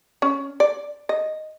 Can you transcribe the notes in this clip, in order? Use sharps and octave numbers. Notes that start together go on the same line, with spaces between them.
C#4
D5
D#5